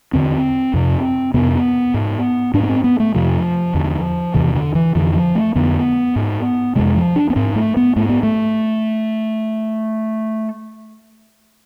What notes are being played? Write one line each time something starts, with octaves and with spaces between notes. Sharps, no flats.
E2 D3 C4
F2 C3
F2 C3 B3
G#2
G#2 D4
B3
C4
B3
A3
F2 C3 F3
E2 D3
E2 C3 E3
D3
E3
F2 D3 E3
F3
A3
F2 D3 B3
G#2
F2 C3 G#3
F3
D4
B3
G#2 C4
A3
B3
G#2 A3
B3
A3